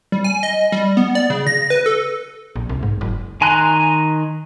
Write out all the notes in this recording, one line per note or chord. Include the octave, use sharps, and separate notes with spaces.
G3
G#5
D#5
G3
B3
D5
C#3
A#6
B4
A4
A#1
C2
G#2
F#1
D#3 G#5 A#5 C6 F#6